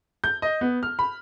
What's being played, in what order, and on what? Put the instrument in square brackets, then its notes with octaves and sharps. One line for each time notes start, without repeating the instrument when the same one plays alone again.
[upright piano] G6
D#5
B3
F6
B5